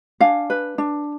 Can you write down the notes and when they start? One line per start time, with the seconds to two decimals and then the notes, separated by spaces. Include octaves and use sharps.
0.20 D4 F5 G#5
0.50 B4
0.78 D4